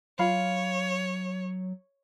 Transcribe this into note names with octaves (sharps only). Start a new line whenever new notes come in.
F#3 F4 C#5 F5 B5